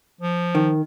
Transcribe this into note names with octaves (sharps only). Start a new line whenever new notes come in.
F3
D#3